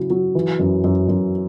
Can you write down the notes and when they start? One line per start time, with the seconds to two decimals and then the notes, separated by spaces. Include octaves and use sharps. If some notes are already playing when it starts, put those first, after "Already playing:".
Already playing: C#3 F#3 C#4 E4
0.10 F#3
0.35 E3
0.59 F#2
0.84 F#2
1.09 F#2